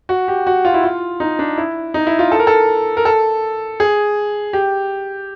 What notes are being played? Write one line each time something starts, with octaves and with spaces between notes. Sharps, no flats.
F#4
G4
F#4
F4
E4
F4
D#4
D4
E4
D#4
E4
F4
A4
A#4
A4
A#4
A4
G#4
G4